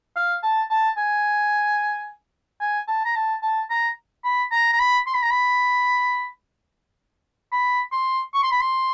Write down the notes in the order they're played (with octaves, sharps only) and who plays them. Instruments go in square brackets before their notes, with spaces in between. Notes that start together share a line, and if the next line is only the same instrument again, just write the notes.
[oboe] F5
A5
A5
G#5
G#5
A5
A#5
A5
A5
A#5
B5
A#5
A#5
B5
C6
B5
A#5
B5
B5
C6
C#6
C6
B5
C6